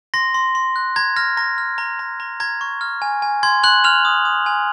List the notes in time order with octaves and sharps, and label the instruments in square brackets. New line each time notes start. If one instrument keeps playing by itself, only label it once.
[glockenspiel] C6 A#6
C6
C6
F#6
A#5 G#6
F6 A#6
A#5 A#6
F6
A#5
A#5
A#5
A#5 G#6
C#6
F6
G#5
G#5
C6 G#6
C6 F#6 F#7
F6 F#6 F7
D#6
D#6
G#5